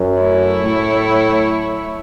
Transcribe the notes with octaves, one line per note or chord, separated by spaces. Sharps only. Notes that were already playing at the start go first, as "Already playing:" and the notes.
Already playing: F#2
F#3 A3 E4 C#5
A2